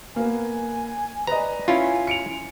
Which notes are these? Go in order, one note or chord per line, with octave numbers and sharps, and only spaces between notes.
A#3 B3 G#5
B4 D5 D#5 A#5
C#4 E4 F4 G#5
C#7 D7 F7